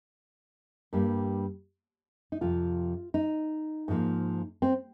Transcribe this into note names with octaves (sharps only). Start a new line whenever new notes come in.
G2 G3 A#3
D#4
F2 C3 F3 F4
D#4
G#2 F3 A#3
C4